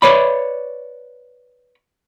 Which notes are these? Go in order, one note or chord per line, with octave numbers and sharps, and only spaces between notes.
B4 C#5 D5 B5